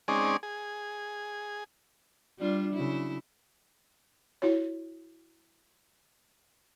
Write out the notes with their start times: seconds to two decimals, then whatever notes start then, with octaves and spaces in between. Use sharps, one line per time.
0.08 G#3 C4 C#4 D#4 G#4 D5
0.43 G#4
2.38 G3 D4 F4
2.73 C#3 F#3 E4
4.42 E4 F#4 C#5